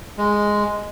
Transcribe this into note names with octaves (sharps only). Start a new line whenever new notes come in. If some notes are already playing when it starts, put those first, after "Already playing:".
G#3